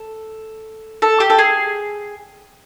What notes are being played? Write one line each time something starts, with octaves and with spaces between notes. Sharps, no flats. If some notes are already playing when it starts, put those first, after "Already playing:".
Already playing: A4
A4
G4
A4
G#4